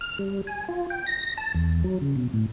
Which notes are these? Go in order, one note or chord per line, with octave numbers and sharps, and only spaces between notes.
F6
G3
G#5
F4
G5
A#6
A5
E2
F#3
C#3
B2
A2